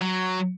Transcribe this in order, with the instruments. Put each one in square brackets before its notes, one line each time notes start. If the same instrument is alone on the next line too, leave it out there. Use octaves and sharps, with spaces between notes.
[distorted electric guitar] F#3